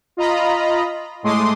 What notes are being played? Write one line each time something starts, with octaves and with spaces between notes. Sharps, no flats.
F4 D#5 A#5 B5
A2 G#3 A3 C6 D6 D#6